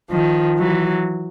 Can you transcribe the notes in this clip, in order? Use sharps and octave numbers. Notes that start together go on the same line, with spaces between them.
D#3 F3
E3 F#3